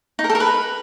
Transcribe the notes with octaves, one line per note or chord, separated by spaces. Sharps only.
D#4
A#4
A4
A#4
B4